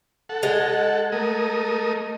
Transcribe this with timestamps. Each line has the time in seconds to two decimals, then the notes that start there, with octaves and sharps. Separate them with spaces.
0.29 A4 F#5
0.43 G#3
1.12 A3 A#4 D#6